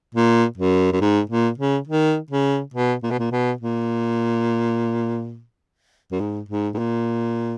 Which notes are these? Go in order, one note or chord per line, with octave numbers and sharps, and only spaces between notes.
A#2
F#2
F#2
G#2
A#2
C#3
D#3
C#3
B2
A#2
B2
A#2
B2
A#2
F#2
G#2
G#2
G#2
A#2